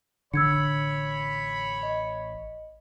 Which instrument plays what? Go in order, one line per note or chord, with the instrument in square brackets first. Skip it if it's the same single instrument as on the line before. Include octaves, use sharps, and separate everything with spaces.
[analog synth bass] A1 [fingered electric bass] D3 [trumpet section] C#5 B5 [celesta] E6 G#6 C#7
[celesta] D#5